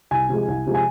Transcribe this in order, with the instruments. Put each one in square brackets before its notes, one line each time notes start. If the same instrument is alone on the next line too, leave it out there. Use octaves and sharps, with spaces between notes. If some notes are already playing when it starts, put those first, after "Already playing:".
[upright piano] C2 G#5
C3 F3 G#3
C2
C3 F3 G#3
G#5